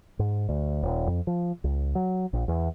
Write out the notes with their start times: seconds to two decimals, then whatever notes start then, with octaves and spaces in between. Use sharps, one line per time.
0.19 G#2
0.49 D2
0.83 D#1
1.07 F2
1.27 F3
1.64 C#2
1.95 F#3
2.33 A#1
2.48 E2